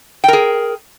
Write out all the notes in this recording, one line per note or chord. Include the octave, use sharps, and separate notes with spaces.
G#4 A#4 G5